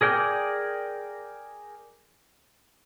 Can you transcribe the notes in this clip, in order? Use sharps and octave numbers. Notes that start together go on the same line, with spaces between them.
G#4 A#4 D5 G5